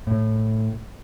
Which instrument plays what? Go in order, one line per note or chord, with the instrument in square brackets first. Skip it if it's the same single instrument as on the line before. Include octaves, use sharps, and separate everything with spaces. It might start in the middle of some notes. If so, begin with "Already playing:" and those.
[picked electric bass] A2